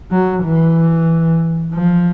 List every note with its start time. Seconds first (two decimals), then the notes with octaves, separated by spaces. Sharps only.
0.11 F#3
0.43 E3
1.74 F3